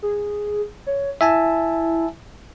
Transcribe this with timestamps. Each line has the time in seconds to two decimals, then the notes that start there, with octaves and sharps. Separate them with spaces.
0.02 G#4
0.86 C#5
1.21 E4 E5 G#5 A5